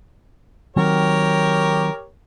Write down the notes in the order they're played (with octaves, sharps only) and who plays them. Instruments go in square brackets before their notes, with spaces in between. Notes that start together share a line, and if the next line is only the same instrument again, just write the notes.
[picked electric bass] D#3 F#3 C4 [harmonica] G4 A#4 C#5